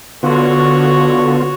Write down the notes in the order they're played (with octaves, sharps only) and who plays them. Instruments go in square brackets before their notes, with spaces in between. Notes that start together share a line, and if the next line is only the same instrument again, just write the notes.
[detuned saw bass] D3 [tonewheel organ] B3 F4 [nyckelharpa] F#4 C#5